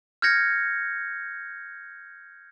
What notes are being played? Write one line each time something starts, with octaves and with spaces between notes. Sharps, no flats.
F6 G6 G#6 A#6 C#7